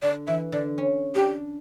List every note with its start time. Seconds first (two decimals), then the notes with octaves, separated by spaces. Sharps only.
0.02 D3 D5
0.27 E3 E5
0.52 D3 D5
0.78 C#4
1.15 D4 G4